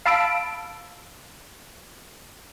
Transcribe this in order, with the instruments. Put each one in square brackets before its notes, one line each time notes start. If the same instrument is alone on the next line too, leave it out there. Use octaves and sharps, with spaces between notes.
[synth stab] F5 A5 B5 E6 D7